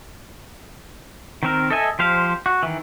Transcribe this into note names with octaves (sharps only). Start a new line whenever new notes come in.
D#3 C4 A#4
A4 D#5 E5 G#5
F3 G4 C5 F5
F#4
D#3 E3